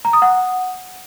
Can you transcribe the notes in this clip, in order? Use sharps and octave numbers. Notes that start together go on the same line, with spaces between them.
A#5
D#6
F#5